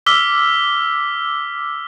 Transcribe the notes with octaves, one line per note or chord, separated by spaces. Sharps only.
D6 E6 F6 B6 G7